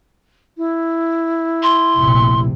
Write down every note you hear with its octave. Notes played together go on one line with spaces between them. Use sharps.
E4
C6
F1 A#1 C3